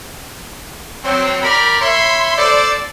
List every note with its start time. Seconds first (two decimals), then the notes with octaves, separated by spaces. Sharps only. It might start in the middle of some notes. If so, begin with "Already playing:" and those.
1.04 F#3 C4
1.42 A#4 D5 G5 A#5 B5
1.81 C#5 E5 B5 C6
2.38 A4 C5 D5